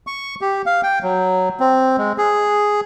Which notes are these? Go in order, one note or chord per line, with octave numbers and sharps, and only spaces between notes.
C#6
G4
F5
G5
F#3
C4
G#3
G#4